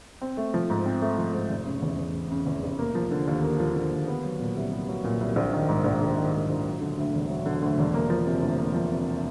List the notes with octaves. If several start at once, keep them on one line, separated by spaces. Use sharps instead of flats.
C4
A3
F3
G#2
C4
A3
F3
G#2
F1
C#3
E2
F1
F1
C#3
E2
F1
A#3
F3
D3
D#2
A#3
F3
D3
D#2
B3
F#3
A#2
C2
B3
F#3
A#2
C2
A#1
D#3
G#2
A#1
A#1
D#3
G#2
A#1
F#3
D3
D2
E1
F#3
D3
D2
E1
A#3
F3
C3
D2
A#3
F3
C3